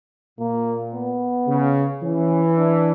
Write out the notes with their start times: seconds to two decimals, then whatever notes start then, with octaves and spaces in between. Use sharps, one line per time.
0.39 A#2 A#3
0.94 B3
1.48 C#3
2.03 E3 C#4
2.58 D4